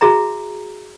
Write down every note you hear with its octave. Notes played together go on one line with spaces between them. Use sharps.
F#4 G#4 E5 A#5